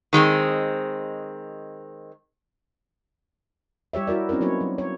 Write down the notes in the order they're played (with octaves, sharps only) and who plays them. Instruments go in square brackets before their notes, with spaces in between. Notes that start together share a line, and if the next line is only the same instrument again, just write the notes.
[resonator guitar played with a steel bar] D#3 G#3 A#3 C4
[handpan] G3 G4 C#5 E5
E4 F#4 A#4 D5
C4 C#4 D#4 E4 A#4
F#3 A#3 B3 D#4 C#5
F#3
C#5